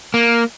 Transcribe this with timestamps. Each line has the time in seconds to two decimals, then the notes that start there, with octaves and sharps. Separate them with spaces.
0.14 A#3